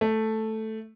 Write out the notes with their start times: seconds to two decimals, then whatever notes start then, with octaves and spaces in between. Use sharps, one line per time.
0.01 A3